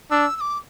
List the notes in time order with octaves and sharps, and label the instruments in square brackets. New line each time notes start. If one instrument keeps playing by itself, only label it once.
[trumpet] D4 [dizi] E6
[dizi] E6
D6